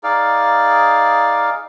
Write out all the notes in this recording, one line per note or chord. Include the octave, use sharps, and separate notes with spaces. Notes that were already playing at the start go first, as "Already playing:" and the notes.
D#4 G#4 D5 F5